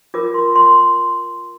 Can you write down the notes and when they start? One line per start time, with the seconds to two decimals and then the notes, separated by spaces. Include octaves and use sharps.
0.14 F4 A#4 D6
0.34 C6
0.56 C6